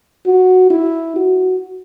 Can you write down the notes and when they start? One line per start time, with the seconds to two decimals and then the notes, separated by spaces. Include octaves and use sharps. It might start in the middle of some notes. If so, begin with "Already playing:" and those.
0.26 F#4
0.70 E4
1.16 F#4